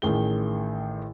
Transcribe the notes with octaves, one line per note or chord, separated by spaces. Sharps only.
A1 D#3 G#4 G7